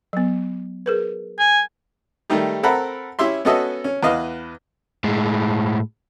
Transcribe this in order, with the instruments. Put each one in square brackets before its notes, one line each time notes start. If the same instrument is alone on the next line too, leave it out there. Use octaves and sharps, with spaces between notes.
[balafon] F#3 B3
G#4 A#4 B4
[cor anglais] G#5
[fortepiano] D#3 G3 A3 D#4 G4
C4 A4 A#4 F#5 A#5 B5
C#4 E4 G4 E5 C6
B3 C#4 F#4 A4 D#5 E5
C#4
E2 B4 D#5 F5
[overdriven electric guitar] A2 G#3